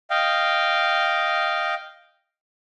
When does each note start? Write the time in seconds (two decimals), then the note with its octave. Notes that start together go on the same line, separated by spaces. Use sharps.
0.10 D#5 F5 G5